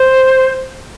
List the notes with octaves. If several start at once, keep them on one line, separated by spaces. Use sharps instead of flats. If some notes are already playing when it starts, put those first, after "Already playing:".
Already playing: C5